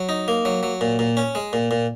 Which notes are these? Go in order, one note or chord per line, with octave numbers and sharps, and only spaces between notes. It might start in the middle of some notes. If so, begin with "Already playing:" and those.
Already playing: F#3
D#4
A#3
F#3
F#3
A#2
A#2
C#4
G#3
A#2
A#2